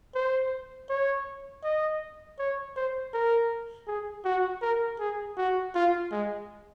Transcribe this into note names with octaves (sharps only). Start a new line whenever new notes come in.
C5
C#5
D#5
C#5
C5
A#4
G#4
F#4
A#4
G#4
F#4
F4
G#3